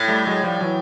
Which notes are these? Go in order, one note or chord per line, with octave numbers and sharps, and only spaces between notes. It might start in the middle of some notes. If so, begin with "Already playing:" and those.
Already playing: A2
G3 A3
F#3 G#3
F3 G3
E3 F#3